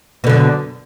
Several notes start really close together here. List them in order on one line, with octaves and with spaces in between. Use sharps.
B2 D3 F#2